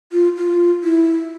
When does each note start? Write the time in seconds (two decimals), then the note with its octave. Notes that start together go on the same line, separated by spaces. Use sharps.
0.12 F4
0.37 F4
0.84 E4